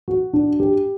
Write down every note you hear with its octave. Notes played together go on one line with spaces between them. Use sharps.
F#4
D4
G4